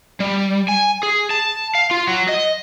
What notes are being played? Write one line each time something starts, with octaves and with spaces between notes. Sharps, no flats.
G3
G#5
G#4
A5
F5
F4
F#3
D#5